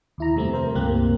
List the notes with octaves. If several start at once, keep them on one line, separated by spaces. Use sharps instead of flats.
D#2 E4 A#5
F2 C3 G3 A3 C4 E4
A#4 C5
C#2 G2 C3 A#3 G4 F#6